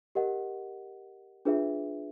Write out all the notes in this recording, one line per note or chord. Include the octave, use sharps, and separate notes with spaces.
G4 A#4 D#5 F#5
D4 F4 G#4 B4 E5